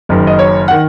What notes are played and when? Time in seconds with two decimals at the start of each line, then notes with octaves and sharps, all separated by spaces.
0.09 F#1 F#2 D#3
0.27 D#5
0.39 C#5
0.68 D#3 F#5